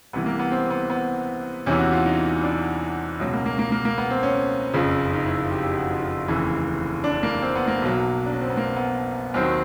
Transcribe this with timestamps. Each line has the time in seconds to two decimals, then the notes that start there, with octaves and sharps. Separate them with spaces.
0.13 C2 C3 E3 B3
0.26 A#3
0.39 B3
0.51 C4
0.70 B3
0.90 B3
1.66 E2 C3 E3 C#4
1.79 F#4
1.92 F4
2.06 D#4
2.43 D4
3.20 C#2 B2 F#3 C#4
3.33 A#3
3.46 A#3
3.59 A#3
3.72 A#3
3.85 A#3
3.98 B3
4.10 C4
4.23 C#4
4.74 F#1 F2 C#3 F3
5.13 D#4
5.25 E4
5.39 F4
5.51 G4
5.63 G4
5.77 F#4
5.90 F4
6.03 F4
6.28 F1 D#2 C#3 E3
7.04 D4
7.23 A#3
7.42 C4
7.55 B3
7.68 A#3
7.82 B1 B2 F#3
8.26 D4
8.33 C#4
8.41 C4
8.50 B3
8.57 A#3
8.76 B3
9.34 D#2 D#3 F#3 C4